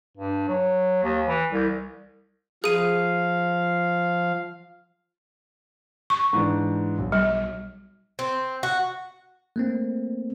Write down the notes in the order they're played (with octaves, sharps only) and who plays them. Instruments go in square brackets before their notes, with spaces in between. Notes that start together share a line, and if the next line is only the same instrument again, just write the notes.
[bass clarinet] G2
F#3
D#2
E3
C2
[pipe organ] F3 F5 [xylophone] G#4 D#7
[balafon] C#6
[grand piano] G#2 E3 D4
B1
[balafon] G3
[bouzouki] C4
F#4
[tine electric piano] A3 A#3 C4